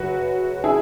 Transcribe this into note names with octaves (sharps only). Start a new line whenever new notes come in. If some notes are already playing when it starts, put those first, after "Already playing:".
Already playing: F#2 C#3 F#3 F#4 B4
E4 G#4